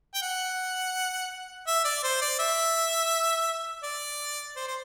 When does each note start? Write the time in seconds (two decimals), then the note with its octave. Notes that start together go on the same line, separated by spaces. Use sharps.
0.14 G5
0.22 F#5
1.67 E5
1.85 D5
2.04 C5
2.21 D5
2.39 E5
3.83 D5
4.56 C5
4.67 C5